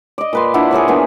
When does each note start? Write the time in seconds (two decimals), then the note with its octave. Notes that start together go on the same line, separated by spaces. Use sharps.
0.18 D5 D#5
0.33 A#2 B4 C6
0.54 D4 E4 F4 F#5
0.71 G#4 A#4 C5 C#5
0.88 E3 A#3 B3 D4